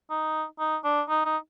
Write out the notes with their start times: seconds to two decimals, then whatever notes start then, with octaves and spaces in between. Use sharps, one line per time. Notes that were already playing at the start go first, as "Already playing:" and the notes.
0.10 D#4
0.59 D#4
0.84 D4
1.09 D#4
1.25 D#4